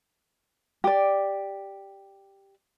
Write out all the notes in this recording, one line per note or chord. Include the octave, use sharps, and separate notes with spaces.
G4 D5